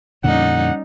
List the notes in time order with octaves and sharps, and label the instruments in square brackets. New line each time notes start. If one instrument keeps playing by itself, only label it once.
[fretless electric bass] F2 A#2 D3 [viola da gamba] G3 C#4 D#4 [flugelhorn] F#5